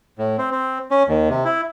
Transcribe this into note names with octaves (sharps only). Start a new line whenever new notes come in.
A2
C4
C4
C#4
D#2
C3
E4